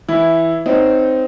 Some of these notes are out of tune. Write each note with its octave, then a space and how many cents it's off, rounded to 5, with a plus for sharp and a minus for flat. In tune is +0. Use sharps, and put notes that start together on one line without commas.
E3 +0 E4 +0
C4 -15 D#4 +0 C#5 +0